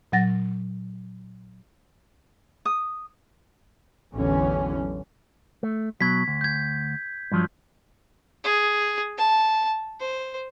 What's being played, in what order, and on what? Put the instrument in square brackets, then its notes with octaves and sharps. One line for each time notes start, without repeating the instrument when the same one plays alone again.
[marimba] A#2 F#3 F#5 A6 A#6
[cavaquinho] D#6
[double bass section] A1 E2 D3 E3 F#3 C#4
[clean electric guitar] A3
[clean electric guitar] B2 F#3 [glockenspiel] G#6 B6
[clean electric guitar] D2
[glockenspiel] G6 G#6
[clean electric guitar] G2 F3 F#3
[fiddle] G#4
A5
C5